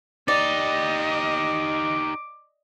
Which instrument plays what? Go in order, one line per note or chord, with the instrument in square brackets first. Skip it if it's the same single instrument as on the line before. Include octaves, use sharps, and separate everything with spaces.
[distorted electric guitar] D#4 G4 [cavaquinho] D5 [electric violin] D#5
[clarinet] D6